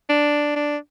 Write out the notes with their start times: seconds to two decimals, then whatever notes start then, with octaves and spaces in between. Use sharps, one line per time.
0.09 D4
0.56 D4